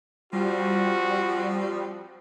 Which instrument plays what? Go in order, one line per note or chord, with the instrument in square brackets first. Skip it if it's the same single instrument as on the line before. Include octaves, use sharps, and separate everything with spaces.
[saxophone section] F3 C4 F4 [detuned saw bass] G3 [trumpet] F#4